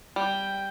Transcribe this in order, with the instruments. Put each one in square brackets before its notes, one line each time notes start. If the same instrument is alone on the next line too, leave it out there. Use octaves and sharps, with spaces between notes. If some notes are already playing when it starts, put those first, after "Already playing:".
[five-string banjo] G3 [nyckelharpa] G5